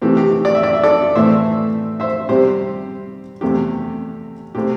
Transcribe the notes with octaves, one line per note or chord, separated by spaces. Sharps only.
C3 E3 A3 C4 G4
G4
G4
D5
E5
D5
E5
A4 D5
A2 E3 A3 C4 C5 E5
C5 E5
C3 G3 C4 G4 C5
E2 C3 A3 C4 G4
C3 A3 C4 G4